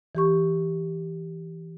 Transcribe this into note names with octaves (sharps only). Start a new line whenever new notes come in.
E3 G4 C#6